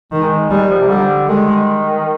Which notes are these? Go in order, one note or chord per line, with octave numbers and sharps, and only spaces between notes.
D#3 G#3
G3 G#3
F3
C3
D3 G3
D#3 G#3